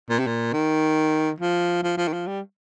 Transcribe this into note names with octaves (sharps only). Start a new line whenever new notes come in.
A#2
C3
A#2
D#3
F3
F3
F3
D#3
F3
G3